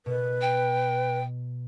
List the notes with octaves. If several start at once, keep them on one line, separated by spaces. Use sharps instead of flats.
B2 B4
G5